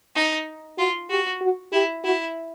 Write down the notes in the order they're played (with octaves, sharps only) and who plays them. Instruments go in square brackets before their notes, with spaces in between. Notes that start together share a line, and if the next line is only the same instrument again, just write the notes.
[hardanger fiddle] D#4
[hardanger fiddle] F4 [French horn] F#4
[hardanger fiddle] F#4 [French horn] G4
[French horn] F#4
[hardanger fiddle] E4 [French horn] G4
[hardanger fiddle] E4 [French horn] F#4